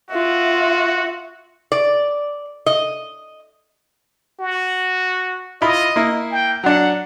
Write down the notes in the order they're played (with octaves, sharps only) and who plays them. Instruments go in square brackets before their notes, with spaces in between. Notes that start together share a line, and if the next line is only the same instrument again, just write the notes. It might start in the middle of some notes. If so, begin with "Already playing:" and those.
[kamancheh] F4 E5 [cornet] F#4
[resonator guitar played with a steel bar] D5
D#5
[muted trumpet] F#4
[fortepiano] E4 F4 B5 [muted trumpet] D#5
[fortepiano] A#3 E4
[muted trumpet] G5
[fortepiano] F#3 D4 [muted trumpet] F#5